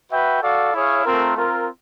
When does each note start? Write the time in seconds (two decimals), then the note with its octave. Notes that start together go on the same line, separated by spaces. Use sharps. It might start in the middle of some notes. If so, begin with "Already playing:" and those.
0.11 F#4 B4 E5 G5
0.42 F#4 A4 D5 F5
0.74 E4 G#4 C#5 F5
1.06 A3 C4 F4 A#4
1.36 C4 F4 A#4